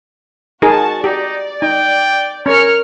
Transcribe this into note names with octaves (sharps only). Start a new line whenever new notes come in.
D#4 F#4 G#4 A#4 A5
D#4 G4 D5
D#4 G5
C#4 A#4 C#5 F6 C#7